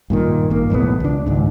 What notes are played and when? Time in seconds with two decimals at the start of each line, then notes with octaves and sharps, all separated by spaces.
0.10 G2 A#2 D#3
0.50 G#1 A#3
0.70 B1 E2 A2 B3
1.00 C#2 D4
1.26 C#2 G#2 D#3